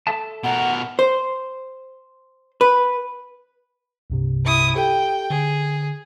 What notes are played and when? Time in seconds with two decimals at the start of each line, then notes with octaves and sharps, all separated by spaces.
0.07 A4 E5 A5
0.44 B2 A#4 F#5
0.99 C5
2.61 B4
4.10 C2 G2 C3
4.45 E4 D#6
4.76 G4 A4 G5
5.30 D3 G#4